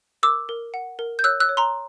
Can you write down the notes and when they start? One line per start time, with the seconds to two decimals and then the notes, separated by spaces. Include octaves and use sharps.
0.23 A#4 D6 E6
0.49 A#4
0.74 F#5
0.99 A#4
1.19 G6
1.24 C#5 E6 F#6
1.40 E6 F#6
1.49 C#5
1.57 A#5 C6